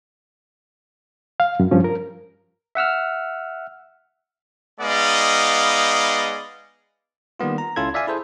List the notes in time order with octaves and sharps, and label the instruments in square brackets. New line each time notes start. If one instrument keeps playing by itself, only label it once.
[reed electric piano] F5
F#2
G2 F3 C#4
A#4
[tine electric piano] E5 F#5 E6 F6
[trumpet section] G#3 B3 D#4 D5 D#5 F5
[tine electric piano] D#3 G3 A#3 B3 F4
A#5
C#2 C#4 E4 F4 A4 G#6
D5 E5 F5 G#5
E4 G#4 A4 C5